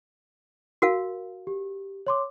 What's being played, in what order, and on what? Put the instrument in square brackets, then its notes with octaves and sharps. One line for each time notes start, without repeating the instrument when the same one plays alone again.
[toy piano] F#4 A#4 F5
[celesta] G4
C#5 C6 D6